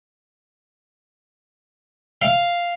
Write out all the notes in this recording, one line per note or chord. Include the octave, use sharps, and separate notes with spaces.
F5